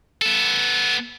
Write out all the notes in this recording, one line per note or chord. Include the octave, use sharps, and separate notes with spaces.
B3 A4